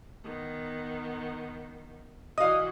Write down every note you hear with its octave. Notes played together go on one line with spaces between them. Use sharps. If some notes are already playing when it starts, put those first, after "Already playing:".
D#3 B3
E3 F#4 D#5 F5 D#6